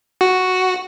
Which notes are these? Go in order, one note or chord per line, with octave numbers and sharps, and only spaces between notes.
F#4